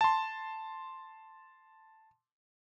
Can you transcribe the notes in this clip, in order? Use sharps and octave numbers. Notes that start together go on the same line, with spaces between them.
A5 C6